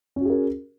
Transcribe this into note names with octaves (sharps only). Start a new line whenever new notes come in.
C#4 F#4 G#4 A#4